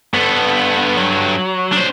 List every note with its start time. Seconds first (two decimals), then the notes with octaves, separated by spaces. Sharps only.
0.14 G2 B3 A4
0.97 F#3
1.72 D4 C5